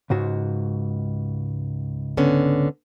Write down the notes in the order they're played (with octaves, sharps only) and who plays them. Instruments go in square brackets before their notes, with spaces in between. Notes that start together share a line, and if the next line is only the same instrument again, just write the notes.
[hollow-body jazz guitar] C#2 G#2 F#4
[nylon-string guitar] D3 B3 C#4